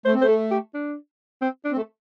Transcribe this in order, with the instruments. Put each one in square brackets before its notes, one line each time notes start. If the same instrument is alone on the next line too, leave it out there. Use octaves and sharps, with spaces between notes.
[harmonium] A3 [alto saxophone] C5
[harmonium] C4
[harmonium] A3 [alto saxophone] C5
[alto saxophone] A4
G4
D4
C4
D4
[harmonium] C4
A3